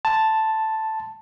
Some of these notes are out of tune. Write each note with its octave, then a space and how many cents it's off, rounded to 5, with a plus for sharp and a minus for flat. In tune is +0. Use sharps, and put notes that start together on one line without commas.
A5 +0 C6 -25